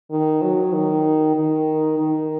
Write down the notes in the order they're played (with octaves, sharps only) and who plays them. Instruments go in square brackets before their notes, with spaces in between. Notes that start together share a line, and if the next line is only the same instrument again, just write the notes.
[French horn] D#3
F#3
D#3
D#3
D#3